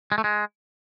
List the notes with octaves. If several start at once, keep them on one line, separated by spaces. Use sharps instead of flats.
G#3
A3
G#3